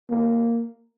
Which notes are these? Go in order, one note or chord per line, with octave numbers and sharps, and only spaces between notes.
A#3